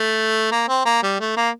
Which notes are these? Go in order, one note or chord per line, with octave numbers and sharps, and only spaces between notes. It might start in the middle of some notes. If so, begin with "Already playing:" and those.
Already playing: A3
A#3
C4
A#3
G3
A3
A#3